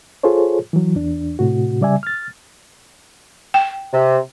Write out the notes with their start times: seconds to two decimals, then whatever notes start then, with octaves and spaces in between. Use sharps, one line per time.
0.23 F4 G#4 A4 C5 C#5
0.73 E3 F#3
0.96 E2 D4
1.39 A2 C3 F#4
1.81 C#3 G3 D5 E5 G#5
2.03 F6 A6
3.54 G5
3.93 C3